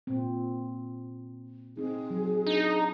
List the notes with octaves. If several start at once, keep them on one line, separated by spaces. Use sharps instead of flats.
A#2 C4
C4 D#4 G#4
F#3
D4 D#4